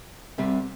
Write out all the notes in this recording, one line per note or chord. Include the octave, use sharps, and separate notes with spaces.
C2 C3 G3